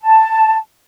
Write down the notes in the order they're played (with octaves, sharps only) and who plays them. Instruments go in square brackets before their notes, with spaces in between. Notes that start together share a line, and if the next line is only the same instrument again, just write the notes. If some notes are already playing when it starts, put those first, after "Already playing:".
[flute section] A5